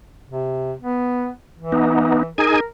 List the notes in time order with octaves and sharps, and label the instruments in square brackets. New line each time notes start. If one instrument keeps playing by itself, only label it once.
[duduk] C3
B3
E3
[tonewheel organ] B3 D#4
[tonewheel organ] D#4 G#4 G#5 [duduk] A#4